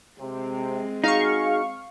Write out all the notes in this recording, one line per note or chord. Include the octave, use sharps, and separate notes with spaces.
C3 G#3 C4
D#4 F#4 G#4 F5 C#6